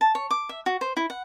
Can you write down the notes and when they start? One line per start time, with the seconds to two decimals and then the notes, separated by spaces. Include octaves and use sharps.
0.01 A5
0.15 C#5
0.31 D6
0.49 E5
0.66 F#4
0.81 C5
0.97 E4
1.10 F#5